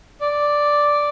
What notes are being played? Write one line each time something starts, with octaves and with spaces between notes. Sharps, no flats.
D5